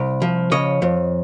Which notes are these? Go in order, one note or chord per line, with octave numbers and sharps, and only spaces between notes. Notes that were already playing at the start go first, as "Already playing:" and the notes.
Already playing: C2 D5
F3
C#3 C#5 D#5
F2